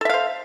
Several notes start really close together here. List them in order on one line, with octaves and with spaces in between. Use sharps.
A4 E5 F5 C5